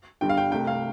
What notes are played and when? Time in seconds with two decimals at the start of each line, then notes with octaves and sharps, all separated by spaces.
0.21 G1 G2 G3 G5
0.29 F5
0.37 G5
0.52 C2 C3 A3 G5
0.67 F5